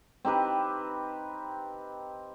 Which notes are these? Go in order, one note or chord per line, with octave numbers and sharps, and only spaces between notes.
C4 D#4 G4 B4